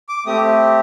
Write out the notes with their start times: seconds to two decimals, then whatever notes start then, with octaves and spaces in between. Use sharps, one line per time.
0.09 D6
0.26 A3 C4 G4 D#6